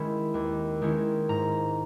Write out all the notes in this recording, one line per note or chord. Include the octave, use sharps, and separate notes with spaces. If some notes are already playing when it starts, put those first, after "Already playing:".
Already playing: D#3 G#3 C#4 E4 B5
D#2
D#3 G#3 C#4 E4
G#2 A#5